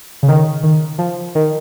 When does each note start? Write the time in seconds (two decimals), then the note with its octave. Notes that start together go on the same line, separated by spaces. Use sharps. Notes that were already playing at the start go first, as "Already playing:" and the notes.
0.23 C#3
0.28 D#3
0.63 D#3
0.98 F3
1.35 D#3